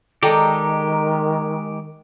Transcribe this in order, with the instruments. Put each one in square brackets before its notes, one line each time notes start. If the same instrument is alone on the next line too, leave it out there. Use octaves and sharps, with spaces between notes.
[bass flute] D#3 [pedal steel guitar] G#3 G4 [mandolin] D#4 A#5 [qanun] A4 D5 G5